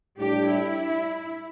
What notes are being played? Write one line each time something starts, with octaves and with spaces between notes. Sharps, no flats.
A2 G3 D4 G4
E4